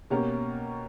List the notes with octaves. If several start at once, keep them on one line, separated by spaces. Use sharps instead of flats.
B2 A#3 C#4 G4 A#4